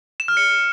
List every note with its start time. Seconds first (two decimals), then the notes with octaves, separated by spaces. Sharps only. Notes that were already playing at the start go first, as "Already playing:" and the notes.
0.20 E7
0.28 F6
0.37 C#7